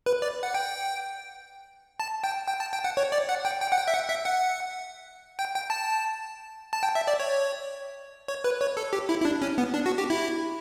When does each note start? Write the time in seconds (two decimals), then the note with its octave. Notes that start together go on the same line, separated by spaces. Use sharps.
0.06 B4
0.22 D5
0.43 F#5
0.54 G5
2.00 A5
2.24 G5
2.48 G5
2.60 A5
2.73 G5
2.84 F#5
2.97 C#5
3.12 D5
3.29 F#5
3.45 G5
3.61 G5
3.72 F#5
3.77 G5
3.88 E5
3.94 F#5
4.09 E5
4.25 F#5
5.39 G5
5.55 G5
5.70 A5
6.73 A5
6.83 G5
6.95 E5
7.07 D5
7.20 C#5
8.28 C#5
8.44 B4
8.61 C#5
8.77 A4
8.93 G4
9.09 E4
9.20 E4
9.25 D4
9.42 C#4
9.58 B3
9.74 D4
9.86 F#4
9.98 G4
10.10 E4